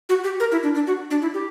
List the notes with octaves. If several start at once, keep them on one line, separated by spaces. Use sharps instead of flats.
F#4
G4
A#4
E4
D4
D4
F#4
D4
E4
G4